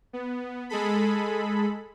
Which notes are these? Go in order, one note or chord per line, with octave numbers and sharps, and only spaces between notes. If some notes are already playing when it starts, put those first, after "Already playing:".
B3
G#3 G#4 A4 B5